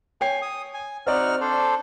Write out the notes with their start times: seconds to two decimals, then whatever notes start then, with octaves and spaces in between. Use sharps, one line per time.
0.21 C#5 G5 G#5 C7
0.42 D#6
0.74 G#5
1.07 C4 D#4 F#4 D5 F6
1.41 D4 A4 C5